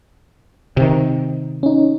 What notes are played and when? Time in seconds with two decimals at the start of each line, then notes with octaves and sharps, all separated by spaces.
0.77 C3 D#3
1.63 C#4 D#4